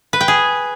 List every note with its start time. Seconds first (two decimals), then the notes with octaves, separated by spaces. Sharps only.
0.13 B4
0.21 G5
0.28 G#4